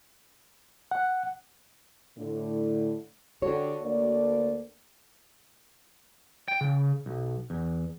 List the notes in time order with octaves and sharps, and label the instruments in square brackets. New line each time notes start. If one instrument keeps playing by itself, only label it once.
[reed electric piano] F#5
[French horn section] A2 D3
[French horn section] D3 G4 A4 [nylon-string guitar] F#4 C#5
[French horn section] D2 A#3 D5
[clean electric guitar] G5
C#3
B1
E2